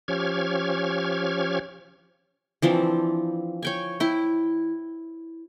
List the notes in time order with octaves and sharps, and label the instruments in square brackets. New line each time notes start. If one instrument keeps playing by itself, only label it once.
[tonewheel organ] F3 C#4 G4 C#5 F6 G#6
[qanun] E3 F3 C4 D4
C#5 G5 G#5
E4 G5